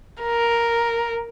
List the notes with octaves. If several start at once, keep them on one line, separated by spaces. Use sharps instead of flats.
A#4